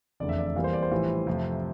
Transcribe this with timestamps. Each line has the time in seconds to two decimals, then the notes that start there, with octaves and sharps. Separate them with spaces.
0.20 F1 E2 D3 A3 D5
0.29 E5
0.38 D5
0.47 E5
0.56 E2 E3 G3 A#3 F5
0.64 C5
0.73 D5
0.82 C5
0.91 A#1 A2 E3 G3
1.27 F2 C3 F3 A3